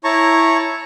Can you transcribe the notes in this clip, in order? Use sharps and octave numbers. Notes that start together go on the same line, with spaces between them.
E4 C#5 A5 A#5 C#6